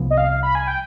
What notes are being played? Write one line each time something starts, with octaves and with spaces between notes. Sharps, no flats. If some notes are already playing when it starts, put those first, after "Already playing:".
Already playing: C2 C3 F3 B3
D#5
F5
B5
G#5
G5